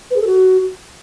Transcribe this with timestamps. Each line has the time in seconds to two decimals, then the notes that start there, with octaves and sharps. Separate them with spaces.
0.11 B4
0.16 G#4
0.21 A4
0.27 F#4